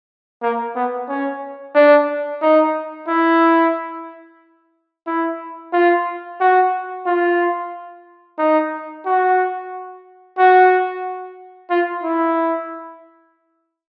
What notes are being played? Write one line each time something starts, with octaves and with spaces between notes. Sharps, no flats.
A#3
B3
C#4
D4
D#4
E4
E4
F4
F#4
F4
D#4
F#4
F#4
F4
E4